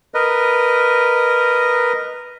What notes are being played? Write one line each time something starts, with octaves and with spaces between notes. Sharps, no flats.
A#4 B4 D#5